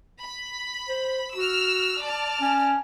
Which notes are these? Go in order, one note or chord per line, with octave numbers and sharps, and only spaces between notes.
B5
C5
F#4 E6 F6
D5 A5 F6
C#4